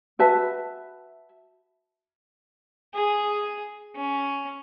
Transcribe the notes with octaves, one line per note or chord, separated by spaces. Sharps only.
F#4 B4 E5 A5
G#4
C#4